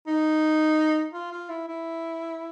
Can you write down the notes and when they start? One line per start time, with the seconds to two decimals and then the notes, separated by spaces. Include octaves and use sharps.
0.07 D#4
1.13 F4
1.31 F4
1.49 E4
1.67 E4